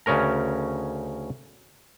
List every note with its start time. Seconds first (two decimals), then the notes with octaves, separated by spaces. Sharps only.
0.06 D2 C#3 C#4 A#4 A#5